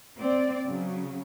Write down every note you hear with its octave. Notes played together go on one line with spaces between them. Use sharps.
C4 D5
C#3 F#3